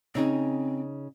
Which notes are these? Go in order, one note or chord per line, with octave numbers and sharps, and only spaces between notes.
C#3 C4 D#4 G#4